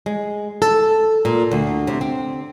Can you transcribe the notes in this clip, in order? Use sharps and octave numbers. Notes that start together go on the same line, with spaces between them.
G#3
A4
A#2
D2
C3
C4